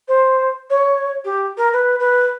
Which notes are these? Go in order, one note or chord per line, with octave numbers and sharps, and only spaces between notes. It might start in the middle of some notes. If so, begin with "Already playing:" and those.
C5
C#5
G4
A#4
B4
B4